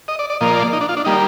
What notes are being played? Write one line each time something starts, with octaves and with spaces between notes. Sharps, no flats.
D#5
D5
D5
A#2 F3 A#3 D#5
D5
D#4
D4
F4
D4
G3 A#3 D#4